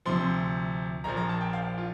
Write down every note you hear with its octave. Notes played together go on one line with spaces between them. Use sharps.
D2 C3 F3 C6
A#1 A#2 F3 A#5
A#5
A5
G5
F5
F4